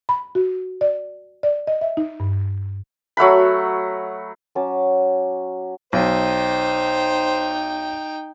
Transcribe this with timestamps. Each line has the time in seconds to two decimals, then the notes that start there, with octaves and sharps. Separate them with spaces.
0.09 B5
0.35 F#4
0.81 D5
1.43 D5
1.67 D#5
1.81 E5
1.97 D#4
2.20 G2
3.17 F#3 A3 F#5 B5
4.55 F#3 C#4 A5 D6
5.93 B1 D#4 C5 G5